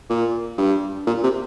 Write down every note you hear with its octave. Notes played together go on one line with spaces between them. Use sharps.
A#2
G2
A#2
C3